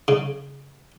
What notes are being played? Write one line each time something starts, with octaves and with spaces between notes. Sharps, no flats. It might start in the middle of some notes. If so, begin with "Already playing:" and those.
C#3